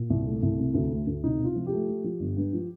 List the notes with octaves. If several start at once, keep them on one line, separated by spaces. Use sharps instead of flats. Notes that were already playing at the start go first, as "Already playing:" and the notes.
Already playing: A#2
C2
A3
C2
C3
D2
A3
D2
C3 D#4
C3 F4
F3
G4
A3
F3
F3
G1
G2
F3